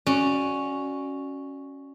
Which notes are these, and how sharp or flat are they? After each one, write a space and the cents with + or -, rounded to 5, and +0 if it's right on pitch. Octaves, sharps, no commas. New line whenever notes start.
C#4 +0 F#4 +5 D5 +15